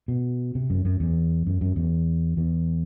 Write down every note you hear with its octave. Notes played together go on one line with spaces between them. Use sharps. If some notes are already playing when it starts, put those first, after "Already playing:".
B2
C3
F#2
F#2
E2
F#2
F#2
E2
E2